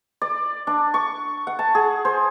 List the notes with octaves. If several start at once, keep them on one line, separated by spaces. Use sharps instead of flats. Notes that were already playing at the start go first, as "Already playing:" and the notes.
D5
D4
C#6
F#5
A5
G#4
C5